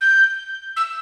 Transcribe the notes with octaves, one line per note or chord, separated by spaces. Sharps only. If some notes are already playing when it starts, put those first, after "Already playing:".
G6
E6